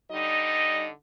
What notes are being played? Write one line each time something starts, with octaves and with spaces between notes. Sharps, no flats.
D3 G3 D#4 D#5